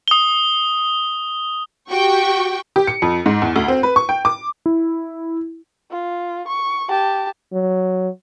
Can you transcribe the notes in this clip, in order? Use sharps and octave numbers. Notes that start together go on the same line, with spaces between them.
D#6 G7
F#4 G4 G5 C#6
G4
C#7
F2
G#2
E2
D2
C4
B4
C#6
G5
D6
E4
F4
C#6
G4 A5
F#3